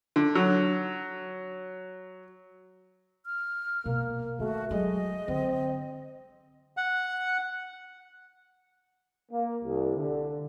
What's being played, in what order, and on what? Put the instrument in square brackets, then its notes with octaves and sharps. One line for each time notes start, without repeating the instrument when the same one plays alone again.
[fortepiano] D3
F#3
[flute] F6
[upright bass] B2 [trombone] A#3
[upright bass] D#3 [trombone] A3 [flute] F#4
[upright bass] F#3 D#4 [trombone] G#3 [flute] D#5
[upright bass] D3 D4 [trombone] C4
[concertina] F#5
[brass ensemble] A#3
C2
D3